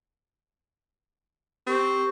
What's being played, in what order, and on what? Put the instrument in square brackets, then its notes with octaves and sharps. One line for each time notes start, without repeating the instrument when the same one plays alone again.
[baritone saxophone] C4 [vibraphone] G4 A#4 C#6